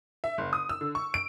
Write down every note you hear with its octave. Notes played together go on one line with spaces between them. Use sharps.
E5
F#1
D#6
E6
D3
C#6
D7